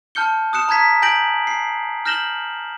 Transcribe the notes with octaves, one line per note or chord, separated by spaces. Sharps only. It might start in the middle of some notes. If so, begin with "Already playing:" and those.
A5 F6 G6 C#7 G7
D#6 F#6 C#7 E7
A5 A#5 F#6 G#6 B6
G#5 G6 A#6 D7 F#7
C7
F6 G6 A#6 E7 F#7 G7